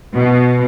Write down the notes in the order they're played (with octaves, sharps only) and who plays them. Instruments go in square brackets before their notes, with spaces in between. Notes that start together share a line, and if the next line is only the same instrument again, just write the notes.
[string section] B2